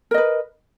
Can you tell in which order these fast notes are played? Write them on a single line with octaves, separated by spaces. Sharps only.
A#4 D#5 B4